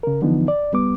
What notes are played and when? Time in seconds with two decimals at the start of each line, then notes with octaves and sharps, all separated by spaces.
0.03 C#3 A#4
0.22 D3 E3 F3 B3 D#4
0.48 D5
0.72 C#2 G3 B3 D6